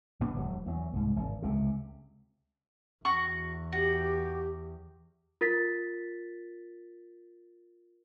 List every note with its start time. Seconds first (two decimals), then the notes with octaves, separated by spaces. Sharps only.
0.20 A2 D3 B3 D4
0.36 E1 F#3
0.66 E2 F#3
0.93 C2 G#2
1.16 G#1
1.42 C#2 C3
3.05 E2 F#4 C#6
3.72 F#4 G4
5.41 F4 A#4 A6 B6